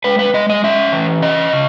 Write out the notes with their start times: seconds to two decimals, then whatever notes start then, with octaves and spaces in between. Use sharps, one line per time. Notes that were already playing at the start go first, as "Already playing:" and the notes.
0.04 G#3 B4
0.19 B4
0.34 G#3 D#5
0.50 D#5
0.64 C#4 E5
0.93 E3
1.22 C#4 D#5
1.53 C#3